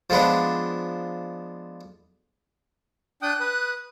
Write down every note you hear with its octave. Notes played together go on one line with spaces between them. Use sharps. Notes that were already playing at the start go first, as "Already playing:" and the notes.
F3 G#3 B3 D4
D4 G5 D#6 F#6
B4 D#6